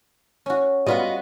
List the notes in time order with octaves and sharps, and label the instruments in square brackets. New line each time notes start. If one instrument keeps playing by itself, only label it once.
[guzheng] C#4 F#4
[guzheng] G3 F4 B4 [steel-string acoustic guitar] B3 F#4 D#5